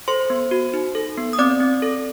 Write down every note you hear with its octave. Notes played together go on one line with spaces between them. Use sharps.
A4 C5 C6
B3
F#4
D#4
A4
B3
D#6
C4 D5 D6
C4
A4